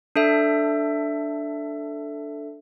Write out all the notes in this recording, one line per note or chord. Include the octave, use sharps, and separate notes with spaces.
D4 A4 E5